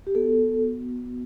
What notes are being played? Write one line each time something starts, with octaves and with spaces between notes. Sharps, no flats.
G4
B3 F#4 A4